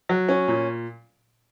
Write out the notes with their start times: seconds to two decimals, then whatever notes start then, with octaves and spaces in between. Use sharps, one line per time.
0.09 F#3
0.29 C#4
0.48 A#2